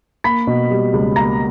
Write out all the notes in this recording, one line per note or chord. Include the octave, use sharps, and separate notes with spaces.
A#3 B5 B6
B2
G3
C#2
A#3 A#5 A#6